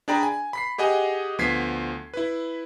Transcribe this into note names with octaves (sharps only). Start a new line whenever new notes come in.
D4 G#4 D5 G5 A#5 B5
G#5
B5 B6 C7
G4 G#4 D#5 F#5 G#5
D2 F3 B3 G#6 B6 C7
E4 B4